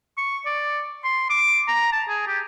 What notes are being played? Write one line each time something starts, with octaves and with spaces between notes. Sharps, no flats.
C#6
D5
C6
D6
A#5
A5
G#4
G4